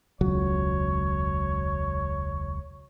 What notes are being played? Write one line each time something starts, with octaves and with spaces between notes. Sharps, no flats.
E1 C#2 F#3 C#5